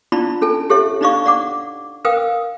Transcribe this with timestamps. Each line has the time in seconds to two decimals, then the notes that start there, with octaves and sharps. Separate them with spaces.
0.12 D4 E4 F4 D5 A5 B5
0.42 C#4 A4 G#5 A5
0.70 G4 A4 C#5 E5
1.01 D4 D#4 D5 D#5 F5 C#6
1.26 D5 F#5 D6
2.05 A#4 B4 F5 G5 D#6